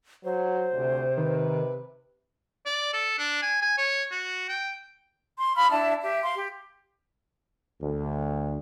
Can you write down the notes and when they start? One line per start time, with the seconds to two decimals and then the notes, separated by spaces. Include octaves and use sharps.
0.24 F#3 C5
0.73 D2 C3
1.17 D#3 B4
2.66 D5
2.93 A4
3.18 D4
3.42 G#5
3.62 G#5
3.78 C#5
4.11 F#4
4.49 G5
5.38 C6
5.57 F5 B5 D#6 F6
5.71 D4 E4 E5 A5
6.03 G4 E5
6.24 F5 C6
6.36 G4
7.81 D2